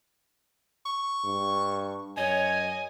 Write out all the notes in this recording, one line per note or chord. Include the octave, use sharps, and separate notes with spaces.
C#6
G2
F#2 C#5 D#5 G#5